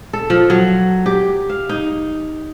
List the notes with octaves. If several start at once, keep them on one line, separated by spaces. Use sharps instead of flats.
A4
F3
F#3
G4
F5
D#4